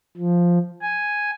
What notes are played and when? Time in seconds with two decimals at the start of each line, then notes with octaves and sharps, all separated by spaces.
0.17 F3
0.82 G#5